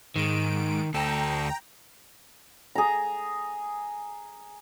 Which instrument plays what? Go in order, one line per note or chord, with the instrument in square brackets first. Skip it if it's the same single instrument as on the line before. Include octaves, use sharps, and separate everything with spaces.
[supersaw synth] G#2 D7 [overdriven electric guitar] D#3
[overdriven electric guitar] D2 A4 [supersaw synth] G5 A#5
[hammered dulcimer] G#4 A#5